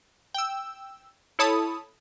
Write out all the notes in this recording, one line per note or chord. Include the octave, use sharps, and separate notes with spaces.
G5 E6
E4 A4 C#5 A5 B5 D#6